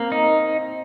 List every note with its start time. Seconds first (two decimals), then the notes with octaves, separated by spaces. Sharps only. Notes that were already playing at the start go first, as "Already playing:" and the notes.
Already playing: A#3 C4
0.12 D#4